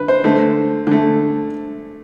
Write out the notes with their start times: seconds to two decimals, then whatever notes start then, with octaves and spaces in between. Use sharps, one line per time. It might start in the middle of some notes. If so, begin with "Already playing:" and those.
Already playing: D3 B4
0.08 C5
0.24 D3 A3
0.87 D3 A3